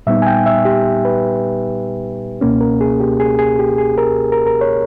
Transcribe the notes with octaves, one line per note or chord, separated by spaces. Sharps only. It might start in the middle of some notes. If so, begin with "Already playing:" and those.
A#2 G3 B3 D#4 E5
G#5
G5
E5
G4
B4
C#2 B2 A#3 C#4
A#4
G#4
G4
G#4
G#4
G4
G#4
A#4
A#4
A#4
C#5